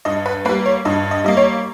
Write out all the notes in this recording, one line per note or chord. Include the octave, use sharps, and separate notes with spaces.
G2 D#5
B4
G3 A#3 B4
C#5
G2 D#5
D#5
G3 A#3 D#5
C#5